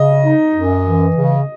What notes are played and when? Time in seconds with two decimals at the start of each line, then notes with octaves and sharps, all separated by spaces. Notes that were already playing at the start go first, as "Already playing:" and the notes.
Already playing: C#3 D#5
0.24 D#4
0.55 F#2
0.84 E3
1.15 C#3